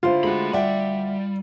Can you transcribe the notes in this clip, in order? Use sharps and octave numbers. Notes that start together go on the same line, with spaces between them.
D3 E4 F4 C5
G#3 A3 F#4 B5
D2 G3 D5 E5 F#5 G5